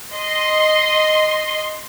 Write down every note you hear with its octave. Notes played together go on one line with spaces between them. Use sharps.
D#5 C6